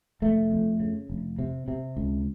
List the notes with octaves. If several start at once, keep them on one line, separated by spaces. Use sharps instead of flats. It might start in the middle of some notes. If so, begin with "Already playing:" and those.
F1 A3
F2
C#3
F1
C3
C3
C#2